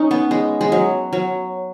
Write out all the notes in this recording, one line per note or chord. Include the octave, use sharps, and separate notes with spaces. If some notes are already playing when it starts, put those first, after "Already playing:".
Already playing: C#4 D#4
B3
G#3
G#3
F#3
F#3